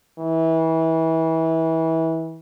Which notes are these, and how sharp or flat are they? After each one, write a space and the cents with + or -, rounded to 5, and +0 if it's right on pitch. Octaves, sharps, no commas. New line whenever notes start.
E3 -25